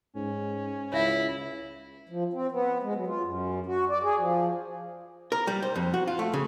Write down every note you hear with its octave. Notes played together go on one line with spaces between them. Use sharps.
G#2 C#4
C#2 E4 C#5 E5 F5
F3
C4
B3
G#3
F#3
F4
F#2
F#4
D5
G#4
F3
A#4
G3
C5
F2
F#4
F4
A3
C#3